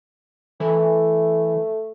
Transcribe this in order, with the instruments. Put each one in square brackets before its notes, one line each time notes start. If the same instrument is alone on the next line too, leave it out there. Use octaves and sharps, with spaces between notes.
[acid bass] E3 [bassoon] A3